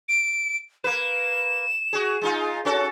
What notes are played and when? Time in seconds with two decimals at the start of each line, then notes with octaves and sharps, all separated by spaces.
0.09 D7
0.84 A#3 B4 E7
1.93 F#4 G#4
2.21 G#3 D#4 F4
2.65 C#4 F#4 A4